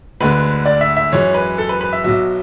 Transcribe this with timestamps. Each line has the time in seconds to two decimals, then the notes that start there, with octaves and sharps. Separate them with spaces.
0.20 D2 D3 G#3 B4
0.66 D5
0.81 E5
0.97 E5
1.12 F#2 E3 G#3 C#5
1.34 B4
1.58 A4
1.69 B4
1.81 B4
1.93 E5
2.04 B1 B2 F#3 E5